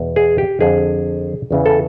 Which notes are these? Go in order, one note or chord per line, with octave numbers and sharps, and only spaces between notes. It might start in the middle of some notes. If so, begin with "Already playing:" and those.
Already playing: E2 B2
G#4
G4
F2 D3 G#4
E2 C#3 E3
A4